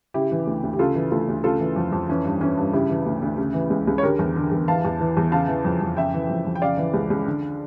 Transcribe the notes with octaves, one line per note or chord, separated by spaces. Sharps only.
C#3 E4 G4
E3
D2
D2
G4
C#3 F4 A4
E3
D2 F4 A4
D2
C#3 F4 A4
E3
F2
F2
E3 C#4
G2
E3 C#4 E4
G2
C#3 E4 G4
E3
D2
D2
C#3
E3
C#2
C#2
C#5
D3 G4 A#4
E2
D3
E2
E3 F5 A5
E2
E3
E2
C#3 F5 A5
E3
F2
F2
C#3 E5 G5
E3
F2
F2
G5
C#3 D5 F5
E3
C#2
C#2
D3